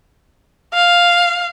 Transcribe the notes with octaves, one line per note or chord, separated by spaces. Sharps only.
F5